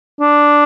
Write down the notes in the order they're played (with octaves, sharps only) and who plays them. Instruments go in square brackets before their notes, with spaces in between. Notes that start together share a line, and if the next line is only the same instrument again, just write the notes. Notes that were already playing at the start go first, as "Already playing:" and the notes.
[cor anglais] D4